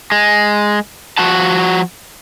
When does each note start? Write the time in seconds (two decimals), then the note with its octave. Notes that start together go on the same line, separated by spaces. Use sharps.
0.12 G#3
1.18 F3 F#4 F#5 A5